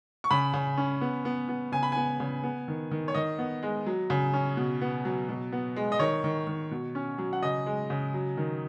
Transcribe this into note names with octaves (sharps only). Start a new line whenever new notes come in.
C#6
C#3 B5
C#3
C#4
B3
B3
B3
C#3 G#5
B5
B3 G#5
C#3
B3
D#3
D#3
C#5
D#3 D#5
B3
G#3
F#3
C#3
C#4
B2
B3
F#3
B2
B3
G#3
D#5
D#3 C#5
D#3
D#3
B2
C#4
F#3
F#5
C#3 D#5
G#3
C#3
F#3
D#3